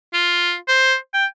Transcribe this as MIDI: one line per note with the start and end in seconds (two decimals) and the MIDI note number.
0.13 0.55 65
0.68 0.96 72
1.14 1.26 79